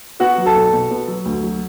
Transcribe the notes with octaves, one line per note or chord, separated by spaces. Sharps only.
B3 F#4 F#5
F#3
A4 A5
B1
B2
B3
F#3
D2
F#3